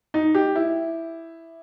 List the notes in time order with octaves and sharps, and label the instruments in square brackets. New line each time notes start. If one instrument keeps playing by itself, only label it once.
[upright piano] D#4
G4
E4